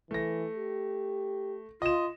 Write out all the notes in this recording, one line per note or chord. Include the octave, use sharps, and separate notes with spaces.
E3 A3 A#6
G4
F4 D#5 E7